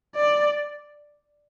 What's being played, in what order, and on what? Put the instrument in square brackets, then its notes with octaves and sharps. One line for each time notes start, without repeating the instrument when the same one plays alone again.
[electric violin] D5